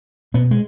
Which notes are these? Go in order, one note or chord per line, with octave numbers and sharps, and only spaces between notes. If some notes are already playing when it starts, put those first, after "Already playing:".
B2 B3
G#3